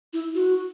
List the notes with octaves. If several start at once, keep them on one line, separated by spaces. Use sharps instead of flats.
E4
F#4